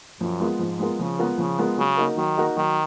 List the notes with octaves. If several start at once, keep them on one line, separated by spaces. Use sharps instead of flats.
F#2 F3
G#3 B3 F4 A#4
G#2 F3
G#3 B3 F4 A#4
C#3 F3
G#3 B3 F4 A#4
C#3 F3
G#3 B3 F4 A#4
C#3 F#3
A#3 D#4 F#4 A#4
D#3 F#3
A#3 D#4 F#4 A#4
D#3 F#3